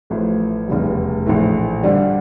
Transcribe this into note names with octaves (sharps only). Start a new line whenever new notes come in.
A1 A2 F3 A3
F1 E2 C#3 G3
A#1 A2 E3 A3
G2 D3 G3 D4